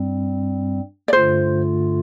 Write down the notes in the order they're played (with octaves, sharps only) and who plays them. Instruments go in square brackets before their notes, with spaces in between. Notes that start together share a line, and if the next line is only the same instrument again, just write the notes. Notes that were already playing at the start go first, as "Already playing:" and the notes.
Already playing: [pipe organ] G2 G3 C4
[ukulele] D5
[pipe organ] G2 D3 A3 F4 [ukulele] C5